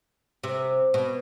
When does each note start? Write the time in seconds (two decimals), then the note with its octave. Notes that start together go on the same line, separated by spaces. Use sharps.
0.44 C3
0.94 B2